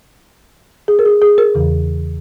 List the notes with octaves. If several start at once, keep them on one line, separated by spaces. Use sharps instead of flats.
G#4
A#4
G#4
G#4
A#4
E2 C#3 E3